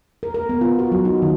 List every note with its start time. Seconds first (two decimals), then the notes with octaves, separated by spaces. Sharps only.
0.23 A#4
0.34 A#4
0.49 B3
0.61 F4
0.79 F#4
0.92 F#3
1.05 D#4
1.22 D#3